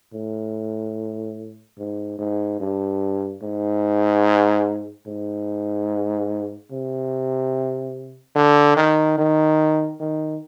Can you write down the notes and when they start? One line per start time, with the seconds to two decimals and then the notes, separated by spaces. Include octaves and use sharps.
0.13 A2
1.78 G#2
2.19 G#2
2.60 G2
3.42 G#2
5.07 G#2
6.71 C3
8.35 D3
8.76 D#3
9.18 D#3
10.00 D#3